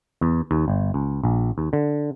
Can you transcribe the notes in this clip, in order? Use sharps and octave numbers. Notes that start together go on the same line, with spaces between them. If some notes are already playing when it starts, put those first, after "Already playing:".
E2
D#2
G1
C#2
A#1
D#2
D3